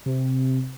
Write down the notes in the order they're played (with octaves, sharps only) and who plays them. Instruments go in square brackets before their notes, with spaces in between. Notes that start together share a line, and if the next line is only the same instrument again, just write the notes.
[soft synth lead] C3